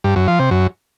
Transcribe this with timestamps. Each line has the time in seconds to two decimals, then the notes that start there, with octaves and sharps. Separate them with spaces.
0.04 G2
0.16 F#2
0.28 F3
0.39 C3
0.51 F#2